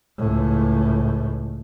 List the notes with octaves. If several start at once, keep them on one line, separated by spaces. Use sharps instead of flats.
C#2 A2